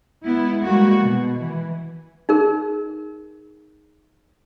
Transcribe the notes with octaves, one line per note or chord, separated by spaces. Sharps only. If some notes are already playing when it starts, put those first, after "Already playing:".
G#3 B3 E4
G3 G#3 A#3 F#4
B2
E3
D#4 G#4 A#4